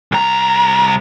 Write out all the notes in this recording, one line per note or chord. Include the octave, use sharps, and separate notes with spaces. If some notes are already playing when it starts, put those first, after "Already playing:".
C2 A#5